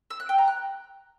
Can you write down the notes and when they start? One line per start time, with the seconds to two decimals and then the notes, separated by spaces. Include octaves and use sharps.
0.10 E6
0.20 F#6
0.29 G5
0.38 A#5
0.48 F#6